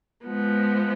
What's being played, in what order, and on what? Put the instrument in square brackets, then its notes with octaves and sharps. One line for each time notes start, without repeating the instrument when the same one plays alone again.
[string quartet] F3 G#3 B3